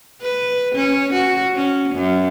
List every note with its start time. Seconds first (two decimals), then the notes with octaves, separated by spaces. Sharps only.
0.22 B4
0.75 C#4
1.13 F#4
1.55 C#4
1.95 F#2